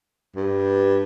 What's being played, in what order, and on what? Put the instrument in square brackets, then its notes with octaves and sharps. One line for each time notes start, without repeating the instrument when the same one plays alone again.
[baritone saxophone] G2